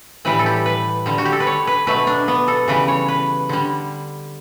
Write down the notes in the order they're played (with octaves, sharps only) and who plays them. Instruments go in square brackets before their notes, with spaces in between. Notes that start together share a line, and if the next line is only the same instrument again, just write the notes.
[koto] A2 E3 G3 B4
A4
G4
B4
D3 G3
F#4
G4
A4
B4
C#5
B4
B2 F#3 A3 B4
D4
B3
A4
C#3 E3 G3 B4
C#5
B4
D3 G3